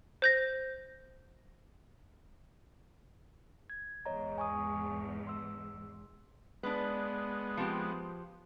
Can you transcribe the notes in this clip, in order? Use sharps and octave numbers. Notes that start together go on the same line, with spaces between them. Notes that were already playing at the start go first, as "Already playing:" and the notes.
C5 G6 A#6
G#6
E2 G#2 C#5 D#5 A#5
G#5 C#6 D#6
C6 E6
G#3 B3 D4 B4
F3 C4 G4